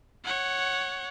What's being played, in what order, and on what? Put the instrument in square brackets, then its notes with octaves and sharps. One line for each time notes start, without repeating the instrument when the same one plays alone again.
[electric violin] C#5 F#5